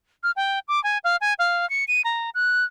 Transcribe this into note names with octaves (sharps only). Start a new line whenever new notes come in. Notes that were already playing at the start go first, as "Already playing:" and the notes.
F6
G5
D6
G#5
F5
G#5
F5
C#7
D#7
A#5
F#6